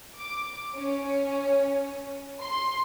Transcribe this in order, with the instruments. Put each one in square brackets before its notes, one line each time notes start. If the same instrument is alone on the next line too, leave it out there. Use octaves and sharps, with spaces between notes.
[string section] D6
C#4
C6